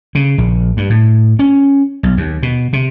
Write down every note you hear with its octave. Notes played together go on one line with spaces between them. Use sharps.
C#3
A#1
G2
A2
C#4
B1
D#2
B2
C3